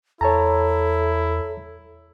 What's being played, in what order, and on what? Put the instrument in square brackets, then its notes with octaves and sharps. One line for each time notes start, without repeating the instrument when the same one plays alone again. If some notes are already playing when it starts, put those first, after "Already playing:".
[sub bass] E2 [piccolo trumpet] E4 [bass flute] A4 [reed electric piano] C#5 A5 A#5